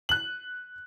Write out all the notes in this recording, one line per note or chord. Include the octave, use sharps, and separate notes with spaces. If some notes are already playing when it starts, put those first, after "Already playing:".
F#6 F#7